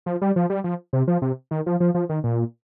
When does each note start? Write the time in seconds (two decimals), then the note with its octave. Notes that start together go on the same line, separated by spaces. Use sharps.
0.06 F3
0.22 G3
0.36 F3
0.50 G3
0.64 F3
0.93 C3
1.08 F3
1.22 C3
1.51 D#3
1.66 F3
1.80 F3
1.94 F3
2.09 D#3
2.24 A#2